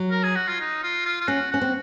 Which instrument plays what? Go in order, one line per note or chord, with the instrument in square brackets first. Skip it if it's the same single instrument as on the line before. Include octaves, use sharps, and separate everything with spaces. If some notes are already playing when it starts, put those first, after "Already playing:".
Already playing: [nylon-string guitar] F#3
[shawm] A#4
G#4
F#4
F4
D#4
F4
F4
F4
[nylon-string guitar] C#4 [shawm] F#4
[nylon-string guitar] C#4 [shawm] F#4
[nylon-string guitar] C4